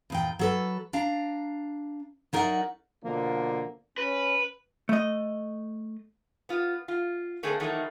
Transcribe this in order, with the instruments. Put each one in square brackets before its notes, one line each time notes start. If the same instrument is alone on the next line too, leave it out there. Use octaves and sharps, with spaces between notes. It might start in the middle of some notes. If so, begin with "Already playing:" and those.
[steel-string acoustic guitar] E2 A#2 G5
F#3 A4 B4
D4 F5 A#5
F#3 D#4 A#4 D5 E5 F#5
[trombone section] B2 D3 F3 A#3
[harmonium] C#4 [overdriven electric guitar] B4
[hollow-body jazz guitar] A3 D#5
[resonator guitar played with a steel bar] B3 F4
F4
D3 A3 A#3 C4 G#4 A4
D#3 E3 F#3 A3 A#3 D#4